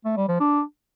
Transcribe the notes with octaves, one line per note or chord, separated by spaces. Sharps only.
A3
G3
F3
D4